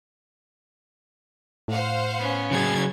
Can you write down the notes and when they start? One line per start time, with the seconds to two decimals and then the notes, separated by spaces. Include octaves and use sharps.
1.68 A2 C5 F5 F#5
2.19 B3 C#4
2.51 C#3 F#3 G#4 G#6 A6